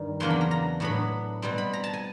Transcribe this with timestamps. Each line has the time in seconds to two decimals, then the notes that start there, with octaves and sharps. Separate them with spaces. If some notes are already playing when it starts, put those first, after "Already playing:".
Already playing: G2 D#3 G3
0.20 E2 C#3 F#3 A#3 D4 C6
0.30 B5
0.41 A#5
0.51 A#5
0.80 A2 F#3 B3 D4 B5
1.42 B2 G3 C4
1.58 B5
1.73 A#5
1.84 A5
1.93 G#5